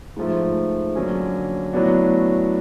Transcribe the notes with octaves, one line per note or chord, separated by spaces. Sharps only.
G#2 F3 A3
D3 F#3 A#3 C#4
A2 F#3 B3 D4 F#4